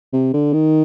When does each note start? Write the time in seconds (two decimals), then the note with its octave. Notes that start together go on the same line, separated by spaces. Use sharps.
0.13 C3
0.33 D3
0.53 D#3